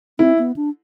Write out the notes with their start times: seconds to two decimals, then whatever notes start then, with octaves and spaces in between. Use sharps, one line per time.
0.19 C4 E4
0.39 B3
0.56 D4